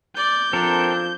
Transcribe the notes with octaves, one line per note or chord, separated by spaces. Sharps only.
D5 G6
F3 C4 D4 A4 A#4